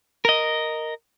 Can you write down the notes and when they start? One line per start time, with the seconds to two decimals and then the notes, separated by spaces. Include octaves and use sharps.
0.25 A#4 D#5